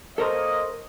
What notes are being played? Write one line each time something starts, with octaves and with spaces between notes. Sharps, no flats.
A#3 A4 A#4 C5 C#5 D#5